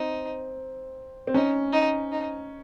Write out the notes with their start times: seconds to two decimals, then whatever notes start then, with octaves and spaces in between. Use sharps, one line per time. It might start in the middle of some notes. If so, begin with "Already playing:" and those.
Already playing: C4 D#4
1.27 C4
1.34 C#4 D#4
1.73 D#4
2.12 D#4